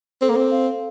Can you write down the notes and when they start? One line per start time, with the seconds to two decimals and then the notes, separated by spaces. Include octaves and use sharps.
0.22 C4 A4
0.29 A#3
0.36 C4
0.51 F5